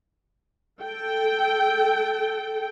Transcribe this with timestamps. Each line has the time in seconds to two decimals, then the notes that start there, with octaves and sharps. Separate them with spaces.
0.81 A4 G5